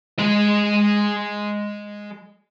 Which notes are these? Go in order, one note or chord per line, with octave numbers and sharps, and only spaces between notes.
G#3 D#5